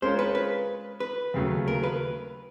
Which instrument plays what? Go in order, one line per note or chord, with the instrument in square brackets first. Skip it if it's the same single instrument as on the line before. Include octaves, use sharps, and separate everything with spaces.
[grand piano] G#3 C#4 F4 A#4 C#5 [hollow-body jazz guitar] C5
[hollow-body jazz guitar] B4
B4
B4
[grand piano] D#2 C#3 F#3 A3
[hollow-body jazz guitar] A#4
B4